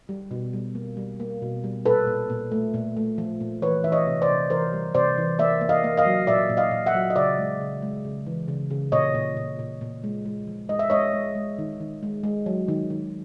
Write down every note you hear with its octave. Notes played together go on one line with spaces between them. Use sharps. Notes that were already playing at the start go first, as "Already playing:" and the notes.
G3
B2
G3
A#3
G3
A#3
B2
G3
A#2 A4 B4
A#2
A#2
A3
A#2
A3
F3
A#2
E3 B4 C#5
E3 E5
C#5 D#5
C3
C5 D5
C3
E3 A#4 C5
G3
C3 C5 D5
E3
A#3 D5 E5
A#3
D#5 F5
A#3
D#5 F5
F#3
A#2 D5 E5
A#2
D#5 F5
A#2
E5 F#5
F#3
D#5
C#3 D5 E5
G#3
C#3
G#3
C#3
E3
C#3
C#3
A#2 C#5 D#5
A#2
A#2
A#2
A#2
G#3
G#3
F3
G#3 D#5
E5
G#3 C#5 D#5
G#3
G#3
D#3
D#3
G#3
G#3
F#3
D#3
D#3